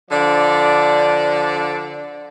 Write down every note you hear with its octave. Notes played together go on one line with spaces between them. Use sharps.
D3 F3 D5